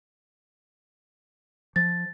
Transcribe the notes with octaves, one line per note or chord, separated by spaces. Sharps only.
F3 A6